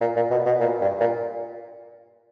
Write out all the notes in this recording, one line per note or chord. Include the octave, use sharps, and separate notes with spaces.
A#2
A#2
B2
B2
A#2
G2
A#2